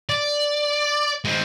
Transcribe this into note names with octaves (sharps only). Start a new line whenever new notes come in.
D5
G#3 C4